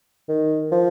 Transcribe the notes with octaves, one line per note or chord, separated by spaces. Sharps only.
D#3
F3